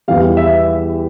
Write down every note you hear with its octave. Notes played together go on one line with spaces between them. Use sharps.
E2 E3 G3 F5
E5